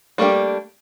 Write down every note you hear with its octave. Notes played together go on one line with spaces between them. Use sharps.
G3 A3 A#3 D4 G4